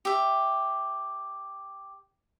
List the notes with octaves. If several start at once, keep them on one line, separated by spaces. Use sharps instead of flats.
G4 E5